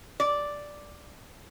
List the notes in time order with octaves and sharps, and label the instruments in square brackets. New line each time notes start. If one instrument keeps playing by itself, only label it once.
[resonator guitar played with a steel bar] D5